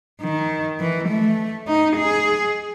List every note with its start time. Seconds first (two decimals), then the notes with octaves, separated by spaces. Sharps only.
0.21 D#3
0.80 E3
1.09 A3
1.68 D#4
1.97 G#4